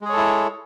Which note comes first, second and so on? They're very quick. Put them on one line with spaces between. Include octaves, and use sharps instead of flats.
G#3 G#4 C#5 A4 E4